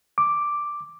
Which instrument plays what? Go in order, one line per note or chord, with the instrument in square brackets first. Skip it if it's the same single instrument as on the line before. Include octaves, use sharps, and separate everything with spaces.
[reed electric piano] D6